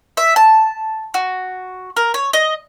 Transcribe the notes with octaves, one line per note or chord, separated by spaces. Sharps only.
E5
A5
F#4
A#4
C#5
D#5